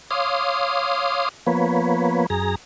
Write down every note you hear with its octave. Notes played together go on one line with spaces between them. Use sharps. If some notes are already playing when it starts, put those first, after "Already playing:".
C#5 F5 C6 D6 D#6
F3 A#3 B3 B4 C#5
F#2 G#4 A#5